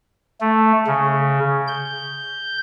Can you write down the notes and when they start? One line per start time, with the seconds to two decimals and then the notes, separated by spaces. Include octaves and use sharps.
0.41 A3
0.87 C#3
1.68 G6